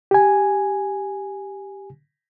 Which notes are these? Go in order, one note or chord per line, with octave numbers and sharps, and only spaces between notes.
G4 G#5